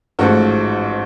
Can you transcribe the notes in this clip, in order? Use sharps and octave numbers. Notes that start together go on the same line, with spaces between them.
A1 G#2 F3 F#4 A4